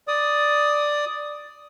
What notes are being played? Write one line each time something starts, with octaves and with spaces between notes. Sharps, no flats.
D5 D#6